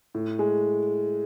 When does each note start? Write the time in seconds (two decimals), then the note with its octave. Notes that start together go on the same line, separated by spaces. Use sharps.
0.15 A2
0.39 G#3